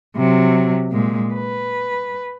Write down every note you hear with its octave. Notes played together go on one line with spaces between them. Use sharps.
C3 F#3
A#2 G#3
B4